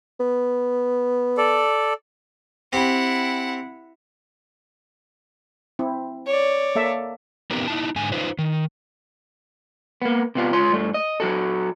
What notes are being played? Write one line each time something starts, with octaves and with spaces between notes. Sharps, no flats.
B3
A4 D5
C4 E4 G4 F#5
C4 E4
C#5 D5
A#3 A4 E5
B3 C4 D#4 G4 A#4 B4
D#4 E4 A5
G#2 D3 G#5
D#4 F4 B4 C5
D#3
A#3 B3
C3 B3 F4
C#2 F4 C#5 C6
G2 A3
D#5
F#3 F#4 A4